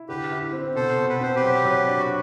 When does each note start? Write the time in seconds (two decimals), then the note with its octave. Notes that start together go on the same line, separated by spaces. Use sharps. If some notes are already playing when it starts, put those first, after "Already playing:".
Already playing: E4
0.09 D3 G4 B4
0.31 E4
0.53 C4
0.75 B2 A4 C5
0.98 B2
1.09 B4
1.20 C4 C5
1.36 G4 B4
1.43 F#3
1.65 F#3
1.87 D4
1.98 F#4